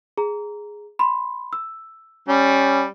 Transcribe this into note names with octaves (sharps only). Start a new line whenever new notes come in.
G#4 A#5
B5 C6
E6
G3 C#4